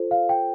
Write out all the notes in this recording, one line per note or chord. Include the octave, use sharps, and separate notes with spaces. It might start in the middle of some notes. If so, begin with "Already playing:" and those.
Already playing: F4 A4 C5
F5
G5